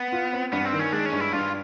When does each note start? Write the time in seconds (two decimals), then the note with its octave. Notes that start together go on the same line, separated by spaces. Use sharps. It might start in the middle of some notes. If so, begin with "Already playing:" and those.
Already playing: B3
0.12 F4
0.33 C4
0.52 G2 B3
0.65 C4
0.73 D#3
0.79 C#4
0.93 G#3 D4
1.06 C#4
1.12 G2
1.20 E4
1.33 G2 F4